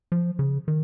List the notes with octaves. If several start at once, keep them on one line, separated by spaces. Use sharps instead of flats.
F3
C#3
D#3